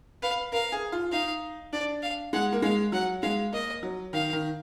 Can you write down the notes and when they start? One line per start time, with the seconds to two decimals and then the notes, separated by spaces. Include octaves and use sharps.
0.22 B4 F5
0.52 A#4 F5
0.72 G#4
0.92 F4
1.12 D#4 F5
1.73 D4 D5
2.03 F5
2.33 G#3 F#5
2.52 A#3
2.62 G#3 F5
2.92 F#3 F#5
3.22 G#3 F5
3.52 A#3 D#5
3.83 F#3
4.13 D#3 F5
4.33 D#3